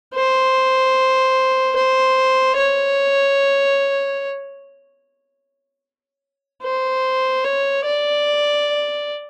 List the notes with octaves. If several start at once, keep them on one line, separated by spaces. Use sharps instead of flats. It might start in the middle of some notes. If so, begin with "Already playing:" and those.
C5
C5
C#5
C5
C#5
D5